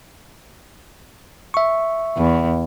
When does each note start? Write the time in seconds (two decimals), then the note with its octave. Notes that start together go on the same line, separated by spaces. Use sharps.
1.54 E5 C#6
2.17 E2